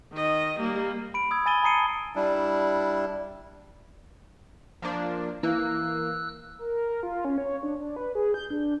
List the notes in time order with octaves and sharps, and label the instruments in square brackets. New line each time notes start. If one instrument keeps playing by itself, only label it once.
[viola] D#3 D#5
G3 A#3
[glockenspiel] B5 D7
D#6 E6 G#6
G#5 B5 A6 D#7 G7
A5 A#5 D#6 C7 C#7 D#7
[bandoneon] G3 D4 E4
[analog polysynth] F3 A#3 D4
[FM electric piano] E3 [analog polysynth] A#3 [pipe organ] E6 F#6
[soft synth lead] A#4
A#4
F4
C#4
C#5
D4
D4
B4
G#4
G6
D4